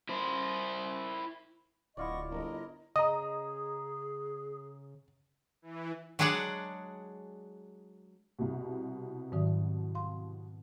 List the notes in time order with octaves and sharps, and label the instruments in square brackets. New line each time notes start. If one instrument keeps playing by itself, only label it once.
[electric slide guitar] E4 C5
[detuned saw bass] D1 [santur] E4 F4 D5 [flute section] D#5 F#5 C#6
[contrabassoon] G1 [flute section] A#4 D#5
[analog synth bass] C#3 [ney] G#4 [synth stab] D#5 [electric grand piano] A#5 D#6
[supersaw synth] E3
[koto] F#3 G#3 D4 G#4 D5 F#5
[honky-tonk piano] C2 B2
[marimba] G#2 D#3 F#3
F5 C6